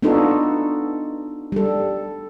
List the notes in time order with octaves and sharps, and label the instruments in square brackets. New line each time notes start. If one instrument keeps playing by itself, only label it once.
[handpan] B3 D4 D#4 F4 F#4 A4
G3 A4